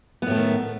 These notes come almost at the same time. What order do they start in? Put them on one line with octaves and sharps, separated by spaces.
B3 A2 A3 D#3